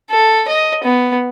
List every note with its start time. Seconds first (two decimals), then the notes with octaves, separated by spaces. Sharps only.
0.10 A4
0.48 D#5
0.84 B3